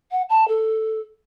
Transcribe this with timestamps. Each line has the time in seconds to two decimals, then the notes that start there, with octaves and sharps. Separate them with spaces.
0.11 F#5
0.29 A5
0.48 A4